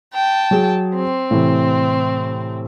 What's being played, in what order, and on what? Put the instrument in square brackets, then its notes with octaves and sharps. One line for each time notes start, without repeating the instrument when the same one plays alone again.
[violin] G5 A5
[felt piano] F#3 G#4
[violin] C4
[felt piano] A2 C3 E3